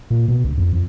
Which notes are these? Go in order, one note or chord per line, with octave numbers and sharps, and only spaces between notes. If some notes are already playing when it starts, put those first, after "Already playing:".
A#2
B2
D2
F2
F2